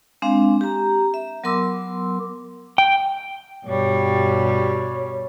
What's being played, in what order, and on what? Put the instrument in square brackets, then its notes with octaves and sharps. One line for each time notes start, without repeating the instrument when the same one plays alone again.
[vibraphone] G#3 C4 D4 F5
G4 A#5
E5
F#3 B3 A#4 C6 D6 E6
[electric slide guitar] G5
[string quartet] G2 B2 G3 [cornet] C#5